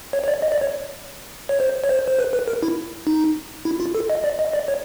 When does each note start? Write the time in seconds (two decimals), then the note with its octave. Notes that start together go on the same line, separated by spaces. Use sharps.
0.13 C#5
0.24 C#5
0.28 D5
0.42 D#5
0.52 D5
0.61 C#5
1.49 C#5
1.60 C5
1.84 C#5
1.89 C5
2.08 C5
2.19 B4
2.33 B4
2.48 A#4
2.63 E4
3.07 D#4
3.65 E4
3.80 F4
3.95 A4
4.10 D#5
4.24 D5
4.39 D#5
4.53 D5
4.68 C#5